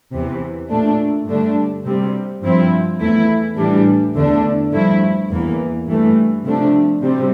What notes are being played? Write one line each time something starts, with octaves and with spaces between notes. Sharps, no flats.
E2 C3 E3
A#2 A3 D4
G2 D3 A3 D4
C3 G3 C4
G2 F3 C4 E4
E2 E3 A3 E4
A2 E3 G3 D4
E2 D3 A3 D4
G2 F3 A3 E4
E2 E3 A#3
G2 E3 A3
C3 F3 A3 D4
C3 G3 C4